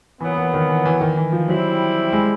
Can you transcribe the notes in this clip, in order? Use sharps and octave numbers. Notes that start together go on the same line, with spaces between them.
A#2 E3 F#3 B3
E3
D#3
E3
E3
D#3
E3
F3
F#3 G3 C4 E4
G#3